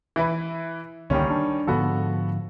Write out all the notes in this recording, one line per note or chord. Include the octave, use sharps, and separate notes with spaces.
E3 E4 B4
C#2 D3 D#3 G3 A#3 C#4
D4
G#2 D3 F3 B3 F#4 A4